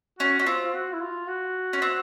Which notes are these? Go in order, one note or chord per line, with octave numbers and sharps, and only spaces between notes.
C#4 F#4
C#4 F#4
C4 F4
F4
F#4
E4
F4
F#4
C#4
C4